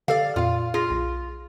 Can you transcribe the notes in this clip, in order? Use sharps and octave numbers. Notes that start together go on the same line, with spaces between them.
D3 G4 A4 D5 F5
F2 A#2 F4 F5
F4 G#4 A#6
B1